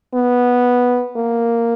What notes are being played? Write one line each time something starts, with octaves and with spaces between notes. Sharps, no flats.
B3
A#3